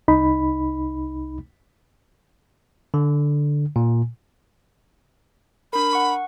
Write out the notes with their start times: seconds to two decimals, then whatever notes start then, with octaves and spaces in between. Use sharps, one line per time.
0.08 C2 D#4 B5
2.94 D3
3.76 A#2
5.73 D4 A#4 B5
5.93 F#5 C#6